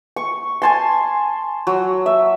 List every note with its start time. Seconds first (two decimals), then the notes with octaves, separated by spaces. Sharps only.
0.16 C#6
0.62 G#5 A5 C6
1.67 F#3
2.06 E5